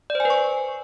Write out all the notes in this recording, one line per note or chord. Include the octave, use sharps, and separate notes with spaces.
D5
C5
G#5
B4
C#6